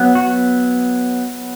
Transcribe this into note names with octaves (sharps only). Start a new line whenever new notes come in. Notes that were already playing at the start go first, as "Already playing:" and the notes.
Already playing: F#3 B3
F#4